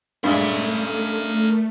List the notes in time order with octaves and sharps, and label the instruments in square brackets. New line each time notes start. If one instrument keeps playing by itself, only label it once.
[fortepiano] G2 A#2 G#3 [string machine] A3 [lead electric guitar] A#4 E5